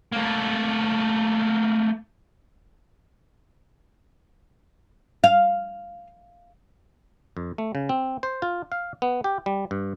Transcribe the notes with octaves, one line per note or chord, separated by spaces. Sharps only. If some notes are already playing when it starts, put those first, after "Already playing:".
A3 A#3
F5
F2
A3
C#3
C4
C5
F4
F5
B3
G4
G3
G2